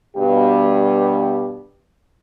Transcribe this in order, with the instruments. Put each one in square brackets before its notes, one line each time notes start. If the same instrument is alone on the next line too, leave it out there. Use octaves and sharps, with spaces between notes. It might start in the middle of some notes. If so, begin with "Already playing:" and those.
[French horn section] G2 B2 G4